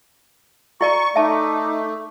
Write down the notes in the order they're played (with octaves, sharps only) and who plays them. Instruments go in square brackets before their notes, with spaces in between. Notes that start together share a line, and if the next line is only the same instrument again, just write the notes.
[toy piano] E4 D5 A#5 [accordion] C#6
[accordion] A3 [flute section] D#4 D6 [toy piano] E5 A5